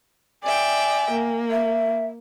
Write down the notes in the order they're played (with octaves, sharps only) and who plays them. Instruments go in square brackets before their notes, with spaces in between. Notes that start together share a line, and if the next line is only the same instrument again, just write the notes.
[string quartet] D5 E5 G5 [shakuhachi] G#5
[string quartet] A#3
[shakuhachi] E5